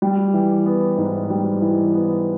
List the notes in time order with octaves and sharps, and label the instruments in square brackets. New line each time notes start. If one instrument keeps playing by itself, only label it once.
[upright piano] G3
E3
B3
G#2
G3
E3
B3